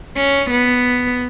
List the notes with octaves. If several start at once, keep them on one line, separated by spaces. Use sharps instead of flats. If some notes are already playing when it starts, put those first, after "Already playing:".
C#4
B3